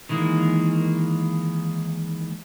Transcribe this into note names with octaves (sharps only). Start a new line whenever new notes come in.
D#3 E3 G#3 A#3